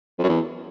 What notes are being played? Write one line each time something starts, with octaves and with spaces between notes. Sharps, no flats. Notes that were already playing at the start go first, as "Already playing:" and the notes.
F2
F#2
E2